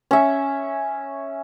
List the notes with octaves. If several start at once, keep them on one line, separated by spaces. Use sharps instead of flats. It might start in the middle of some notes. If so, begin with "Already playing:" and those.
C#4 E5